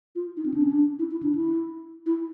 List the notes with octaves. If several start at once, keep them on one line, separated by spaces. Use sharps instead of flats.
F4
D#4
C4
D4
C#4
D4
E4
E4
D4
E4
E4